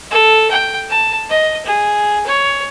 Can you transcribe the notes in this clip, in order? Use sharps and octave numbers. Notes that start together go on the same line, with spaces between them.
A4
G5
A5
D#5
G#4
C#5